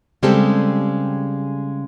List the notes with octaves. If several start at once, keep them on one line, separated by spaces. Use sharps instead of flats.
C#3 G3 G#3 C4 G4 A4